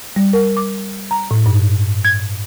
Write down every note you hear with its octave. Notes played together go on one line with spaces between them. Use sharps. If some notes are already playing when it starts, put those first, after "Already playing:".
G3
A#4
D6
A#5
A2
G2
G#6